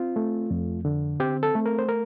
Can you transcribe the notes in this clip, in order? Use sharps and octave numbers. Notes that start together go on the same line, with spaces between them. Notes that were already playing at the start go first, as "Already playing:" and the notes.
Already playing: C4 F4
A3
F2
D3
C4 G4
A4
A3
A#4
C5
A#4